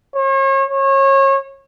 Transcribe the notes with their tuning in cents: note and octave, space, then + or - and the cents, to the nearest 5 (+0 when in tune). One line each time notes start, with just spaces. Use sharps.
C#5 -40
C#5 -30